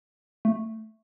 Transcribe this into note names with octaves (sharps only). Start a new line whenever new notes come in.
A3